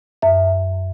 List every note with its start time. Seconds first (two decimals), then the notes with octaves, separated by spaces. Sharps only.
0.22 F#2 E5